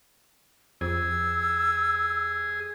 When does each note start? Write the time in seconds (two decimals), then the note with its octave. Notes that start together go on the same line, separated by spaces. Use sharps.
0.81 F2 G#4 E6